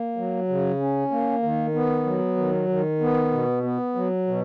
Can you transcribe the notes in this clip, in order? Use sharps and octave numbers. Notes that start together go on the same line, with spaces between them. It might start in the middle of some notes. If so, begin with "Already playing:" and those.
Already playing: A#3
F#3
C#3
C#4
A#3
D#3
B3
F#3
D#3
D#3
B3
B2
B3
F#3
B2